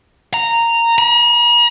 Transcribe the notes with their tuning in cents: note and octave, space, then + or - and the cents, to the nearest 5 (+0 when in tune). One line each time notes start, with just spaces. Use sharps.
A#5 -10
A#5 +45